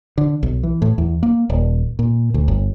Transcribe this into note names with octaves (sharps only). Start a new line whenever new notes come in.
D3
B1
E3
A2
E2
A#3
D#1
A#2
D2
G1